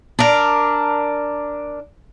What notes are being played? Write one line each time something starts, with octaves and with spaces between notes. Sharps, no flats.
D4 A#4